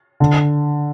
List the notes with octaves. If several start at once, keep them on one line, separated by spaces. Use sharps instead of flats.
D3